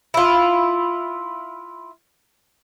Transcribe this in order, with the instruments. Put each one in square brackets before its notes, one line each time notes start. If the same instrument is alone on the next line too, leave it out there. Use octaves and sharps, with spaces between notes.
[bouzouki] E4 F4